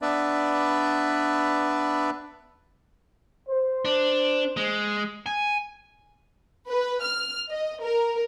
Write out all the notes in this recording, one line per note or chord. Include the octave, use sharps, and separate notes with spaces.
B3 D4 B4 D5 E5
C5
D4
G#3
G#5
B4
F6
D#5
A#4